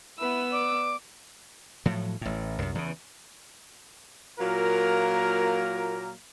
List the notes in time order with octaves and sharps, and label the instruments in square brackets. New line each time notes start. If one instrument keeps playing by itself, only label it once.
[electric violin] B3 E6 [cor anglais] E4 [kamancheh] B4
[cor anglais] D5 [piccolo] D6
[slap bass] A2 F3 F#3
A1 A2
C2 F#2
E2 C#3
[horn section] A#2 F#3 A#3 F4 A#4